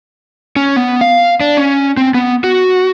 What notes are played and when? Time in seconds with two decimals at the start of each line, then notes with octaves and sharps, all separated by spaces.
0.56 C#4
0.76 B3
1.01 F5
1.41 D4
1.57 C#4
1.97 C4
2.14 B3
2.44 F#4